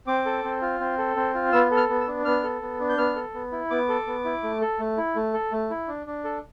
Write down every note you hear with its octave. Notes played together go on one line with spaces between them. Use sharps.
C4 D6
A4
C4
F4
C4
A4
C4
F4
B3 E6
A4
F6
B3
E6
D4
B3 F6
A4
B3
D4
G6
B3 F6
A4
B3
E4
B3 D6
A4
B3
E4
A3
A4
A3
E4
A3
A4
A3
E4
D4
D4
A4